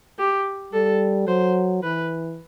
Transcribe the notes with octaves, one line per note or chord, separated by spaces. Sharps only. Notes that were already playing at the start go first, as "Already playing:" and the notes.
G4
G3 A4
F#3 C5
E3 B4